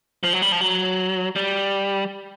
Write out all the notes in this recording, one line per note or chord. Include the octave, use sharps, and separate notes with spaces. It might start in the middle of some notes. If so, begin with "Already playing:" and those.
F3
F#3
G3
F3
F#3
G3